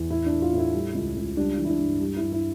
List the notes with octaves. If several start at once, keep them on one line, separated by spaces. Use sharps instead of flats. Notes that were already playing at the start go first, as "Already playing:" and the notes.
Already playing: E2
A2 E4
D4
A2
F4
A2 E4
G3
C#2
C#2
G3 D4
E3
E4
D4
G2
G3
G2 E4
E4